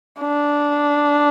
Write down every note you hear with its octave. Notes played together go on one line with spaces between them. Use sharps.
D4